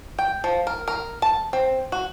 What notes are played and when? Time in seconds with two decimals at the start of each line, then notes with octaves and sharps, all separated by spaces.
0.19 G5
0.44 F3
0.67 A#4
0.88 A#4
1.22 A5
1.53 C4
1.92 F#4